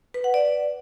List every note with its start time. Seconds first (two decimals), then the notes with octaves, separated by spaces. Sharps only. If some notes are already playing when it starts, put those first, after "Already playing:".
0.14 B4
0.24 F#5
0.34 D5